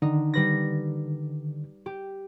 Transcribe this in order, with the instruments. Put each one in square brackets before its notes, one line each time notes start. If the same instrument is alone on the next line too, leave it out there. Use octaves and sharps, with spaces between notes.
[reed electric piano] D3 D#3 [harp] D#4
[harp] G3 B4 A#6
G4